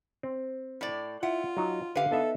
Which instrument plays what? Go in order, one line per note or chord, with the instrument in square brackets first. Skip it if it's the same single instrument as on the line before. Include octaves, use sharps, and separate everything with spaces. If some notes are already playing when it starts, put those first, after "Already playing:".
[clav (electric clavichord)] C4
[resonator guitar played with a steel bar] A2 D5
[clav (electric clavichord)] E4 [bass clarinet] F4 [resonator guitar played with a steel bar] F#5
[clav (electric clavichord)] F#3 D#4
[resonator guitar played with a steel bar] D3 F5 [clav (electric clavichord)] G4 B4
[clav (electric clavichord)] B3 D#4 E5 [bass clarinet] A4